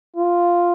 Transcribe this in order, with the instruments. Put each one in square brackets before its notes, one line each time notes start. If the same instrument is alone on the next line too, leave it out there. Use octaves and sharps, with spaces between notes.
[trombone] F4